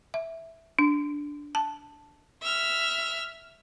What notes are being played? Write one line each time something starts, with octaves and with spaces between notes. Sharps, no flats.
E5
D4
A5
E5 F6